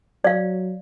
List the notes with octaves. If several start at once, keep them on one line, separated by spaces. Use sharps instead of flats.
F#3 D5 F5